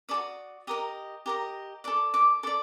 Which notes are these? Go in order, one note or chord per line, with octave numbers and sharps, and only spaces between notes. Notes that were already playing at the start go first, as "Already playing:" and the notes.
A4 D5 D#6
F#4
G4 A#4 D#5 D#6
G4 A#4 D#5
A4 D5 D6
D6
A4 D5 D6